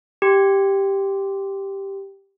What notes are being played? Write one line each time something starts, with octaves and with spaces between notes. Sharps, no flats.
G4 C6